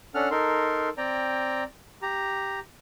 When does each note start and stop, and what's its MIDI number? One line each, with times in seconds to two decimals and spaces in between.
0.15 0.29 61
0.15 0.29 62
0.15 0.29 69
0.15 0.29 78
0.15 0.29 89
0.31 0.89 63
0.31 0.89 69
0.31 0.89 70
0.31 0.89 84
0.98 1.63 60
0.98 1.63 74
0.98 1.63 79
0.98 1.63 82
2.02 2.59 67
2.02 2.59 82